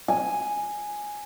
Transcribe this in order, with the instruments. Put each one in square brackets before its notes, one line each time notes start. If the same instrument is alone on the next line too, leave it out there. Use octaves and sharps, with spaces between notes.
[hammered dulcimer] G#5